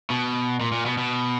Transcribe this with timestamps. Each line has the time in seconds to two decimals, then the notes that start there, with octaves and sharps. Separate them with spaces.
0.10 B2
0.61 A#2
0.72 A#2
0.86 B2
0.98 B2